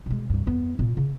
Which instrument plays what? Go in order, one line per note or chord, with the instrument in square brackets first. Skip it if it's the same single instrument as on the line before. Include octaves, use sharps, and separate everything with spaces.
[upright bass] B2 G#3
C2 G2
F2 B3
A#2 F4
C#3